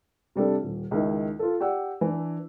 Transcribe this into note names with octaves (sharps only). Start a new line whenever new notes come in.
C3 G3 D4 A4
D#1
C#2 D#3 E4
F4 A4
G4 D5 F#5 E6
E3 D4